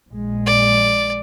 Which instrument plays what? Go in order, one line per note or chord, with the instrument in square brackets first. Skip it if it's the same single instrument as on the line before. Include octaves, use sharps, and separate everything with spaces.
[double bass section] A#1 G#3
[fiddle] D5